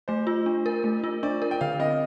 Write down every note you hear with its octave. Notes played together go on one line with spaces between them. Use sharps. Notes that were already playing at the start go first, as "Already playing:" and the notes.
A3 C5
F4
D4
A#4
A3
F4
D4 D5
A#4
G5
D3 F5
C4 D#5